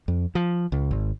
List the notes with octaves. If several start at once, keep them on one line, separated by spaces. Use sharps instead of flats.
F2
F3
C#2
G#1